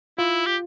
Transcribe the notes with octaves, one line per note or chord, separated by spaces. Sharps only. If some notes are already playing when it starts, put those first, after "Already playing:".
E4 F4
G4